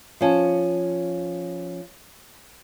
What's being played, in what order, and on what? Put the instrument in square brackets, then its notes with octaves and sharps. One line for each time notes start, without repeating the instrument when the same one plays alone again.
[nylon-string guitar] F3 C#4 A5